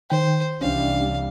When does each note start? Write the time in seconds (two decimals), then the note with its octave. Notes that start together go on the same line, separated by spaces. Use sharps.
0.10 D#3 C5 G5
0.61 C2 E3 G3 C#4 D4 F5